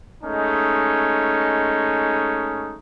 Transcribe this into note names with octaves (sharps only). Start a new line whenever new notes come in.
G#3 A3 C#4 D#4